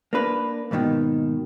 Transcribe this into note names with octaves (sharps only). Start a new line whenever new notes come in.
A#3 D4 B4
D#2 G#2 B2 D#3